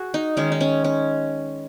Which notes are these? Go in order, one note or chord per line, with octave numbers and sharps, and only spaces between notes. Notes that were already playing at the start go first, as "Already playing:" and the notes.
Already playing: F#4 G#4
D#4
D#3 G#3 C#4
D#4
C#4
C#4